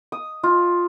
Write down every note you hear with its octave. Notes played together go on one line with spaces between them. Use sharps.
D#6
F4